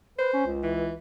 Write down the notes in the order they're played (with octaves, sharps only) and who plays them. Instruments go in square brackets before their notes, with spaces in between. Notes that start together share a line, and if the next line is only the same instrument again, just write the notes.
[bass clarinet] B4 [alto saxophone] C5
[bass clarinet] C#4
C#2
[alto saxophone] E3